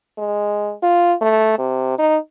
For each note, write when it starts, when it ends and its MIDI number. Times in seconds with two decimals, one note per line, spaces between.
0.18 0.73 56
0.82 1.14 65
1.21 1.53 57
1.58 1.94 48
1.98 2.17 63